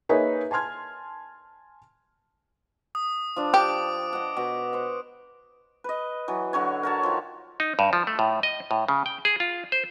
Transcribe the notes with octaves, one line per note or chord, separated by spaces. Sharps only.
A#3 D#4 G#4 B4 C#5 E5
G#5 A5 C6 F6 G#6
D#6
F3 D4
G4 D6 D7
D#5 F#5
B2
C5 F#5
B4 D#5
E3 F#3
D3 F#3 C#5
A#4 C#5 A5
D#3 F3
D#4
G2
F3
A3
A2
D#5
A2
C#3
G5
G#4
F4
C5